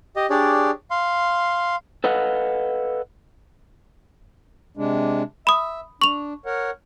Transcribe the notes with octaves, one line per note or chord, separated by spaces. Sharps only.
G4 D#5
D4 G4 G#4 C#5 D5
F5 C6
A4 B4 D#5 F5 F#5
C3 G#3 D4
E5 B5 D#6
D4 C#6 F7
A#4 C#5 F#5